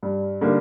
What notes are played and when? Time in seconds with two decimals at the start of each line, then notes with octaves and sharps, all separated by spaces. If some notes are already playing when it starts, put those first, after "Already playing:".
0.03 G2
0.41 D3 G3 A#3 D#4